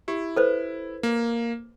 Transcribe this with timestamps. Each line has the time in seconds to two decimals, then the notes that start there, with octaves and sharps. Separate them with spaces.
0.08 E4 G4
0.36 A4 B4 C5
1.03 A#3